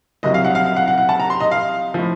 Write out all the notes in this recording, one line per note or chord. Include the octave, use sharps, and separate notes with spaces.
C2 C3 F#3 D#5
F5
F#5
F5
F5
F#5
F#5
F#5
A5
A#5
C6
D#5
F5
A2 F3